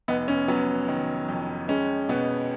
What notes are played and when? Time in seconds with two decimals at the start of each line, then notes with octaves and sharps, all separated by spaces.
0.08 F1 B3 D#4
0.28 C#4
0.48 F#3 B3
0.88 D#3
1.29 F2
1.68 G#3 C#4
2.09 B2 B3